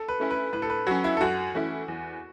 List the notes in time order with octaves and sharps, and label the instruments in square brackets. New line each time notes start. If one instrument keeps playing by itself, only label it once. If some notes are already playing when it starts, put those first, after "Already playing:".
Already playing: [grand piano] A4
B4
[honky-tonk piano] A3 C#4 E4
[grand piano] B4
[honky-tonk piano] A2 [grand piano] B4
[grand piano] A4
B4
[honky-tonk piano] F#3 C#4 [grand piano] F#4
[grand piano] E4
A4
[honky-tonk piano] F#2 [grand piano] F#4
[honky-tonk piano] E3 A3 C#4 E4
E2